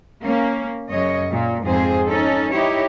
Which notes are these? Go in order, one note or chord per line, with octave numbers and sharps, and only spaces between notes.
A#3 C#4
F#2 C#3 C#5 D#5
A#2
F2 G#2 C4 G#4 C5
C#4 D#4 A4
D#4 E4 G4 C#5